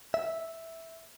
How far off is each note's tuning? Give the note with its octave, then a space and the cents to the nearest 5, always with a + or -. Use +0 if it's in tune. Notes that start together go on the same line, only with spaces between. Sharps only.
E5 -5